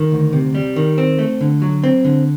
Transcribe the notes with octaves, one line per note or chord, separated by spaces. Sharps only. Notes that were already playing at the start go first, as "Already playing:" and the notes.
Already playing: D#3
D2
C3
G3
D#3
C4
A3
D3
F#3
C4
D3